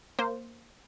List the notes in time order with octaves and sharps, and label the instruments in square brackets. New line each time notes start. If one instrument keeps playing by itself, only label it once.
[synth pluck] A#3 C5